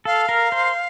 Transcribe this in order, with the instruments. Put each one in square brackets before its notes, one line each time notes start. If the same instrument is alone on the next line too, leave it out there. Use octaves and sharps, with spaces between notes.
[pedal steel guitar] A4 [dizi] F5
[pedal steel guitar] A#4
C5